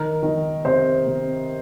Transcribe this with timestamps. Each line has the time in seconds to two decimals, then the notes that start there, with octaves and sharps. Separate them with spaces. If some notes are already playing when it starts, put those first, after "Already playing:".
Already playing: D#3 A#4
0.23 D#3
0.65 C3 C5
1.06 C3